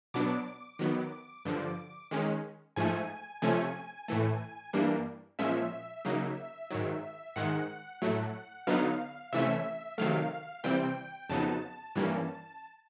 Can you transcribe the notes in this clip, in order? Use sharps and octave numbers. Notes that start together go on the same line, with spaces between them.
B2 F#3 B3 D4 D6
D#3 F#3 B3
G2 D3 F3
D#3 G#3 C#4
G#2 F3 A3 G#5
C3 F3 A3 C#4 G#5
A2 E3 A3
G2 E3 G3 A#3 D4
A#2 F3 G#3 C#4 E5
C#3 F#3 A#3 D#4
G#2 D#3 F#3
G#2 D#3 G#3 F#5
A2 F#3 A3
D3 F#3 B3 D#4 F5
C3 E3 A3 C#4 E5
C3 D#3 F#3 A3 F5
C3 E3 G3 C4 G5
F2 C#3 F#3 B3 D#4 A5
G2 E3 G3 A#3 C#4